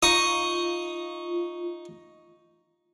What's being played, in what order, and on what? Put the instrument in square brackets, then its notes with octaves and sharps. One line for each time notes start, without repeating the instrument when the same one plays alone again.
[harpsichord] D#4 C#6 D#6 [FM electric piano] F4